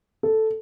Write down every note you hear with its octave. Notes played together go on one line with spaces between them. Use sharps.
A4